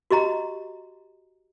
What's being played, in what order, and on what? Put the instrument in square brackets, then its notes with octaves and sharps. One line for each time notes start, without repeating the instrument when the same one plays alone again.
[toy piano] F#4 G4 D#5 A#5